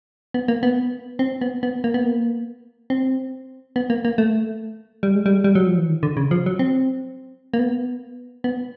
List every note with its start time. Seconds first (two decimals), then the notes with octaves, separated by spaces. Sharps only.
0.34 B3
0.48 A#3
0.63 B3
1.19 C4
1.41 B3
1.63 B3
1.84 A#3
1.94 B3
2.05 A#3
2.90 C4
3.76 B3
3.90 A#3
4.05 A#3
4.18 A3
5.03 G3
5.15 G#3
5.26 G3
5.44 G3
5.55 F#3
5.67 F3
5.78 E3
5.89 D#3
6.03 D3
6.17 C#3
6.31 F3
6.46 F#3
6.59 C4
7.54 A#3
7.59 B3
8.44 B3